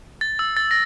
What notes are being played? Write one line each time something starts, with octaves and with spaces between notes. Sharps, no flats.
A6
E6
A6
A#6